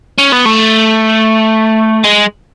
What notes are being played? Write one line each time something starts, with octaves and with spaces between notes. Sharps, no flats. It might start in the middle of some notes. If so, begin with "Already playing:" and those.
C#4
B3
A3
G#3